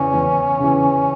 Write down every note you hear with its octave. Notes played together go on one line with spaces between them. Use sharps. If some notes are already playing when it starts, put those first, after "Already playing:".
Already playing: E2 C#3 E3 C#4
E2
C#3 E3